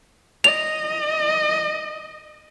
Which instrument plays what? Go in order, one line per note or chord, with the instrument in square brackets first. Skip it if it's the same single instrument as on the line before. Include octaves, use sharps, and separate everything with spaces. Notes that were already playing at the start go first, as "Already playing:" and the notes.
[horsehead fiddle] D#5 [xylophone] F7